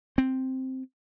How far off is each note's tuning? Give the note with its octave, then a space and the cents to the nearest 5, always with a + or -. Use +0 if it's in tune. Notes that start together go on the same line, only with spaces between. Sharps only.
C4 +0